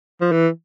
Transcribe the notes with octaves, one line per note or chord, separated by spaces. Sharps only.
F3
E3